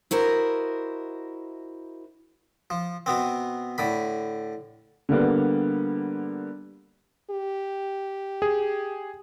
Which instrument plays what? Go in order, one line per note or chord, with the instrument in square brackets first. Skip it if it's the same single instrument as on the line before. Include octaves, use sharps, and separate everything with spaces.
[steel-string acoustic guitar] E4 F#4 A#4 C5 D#5
[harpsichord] F3
B2 B3 C4
A2 D3 B5
[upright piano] D3 G3 A#3 B3
[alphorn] G4
[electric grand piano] G#4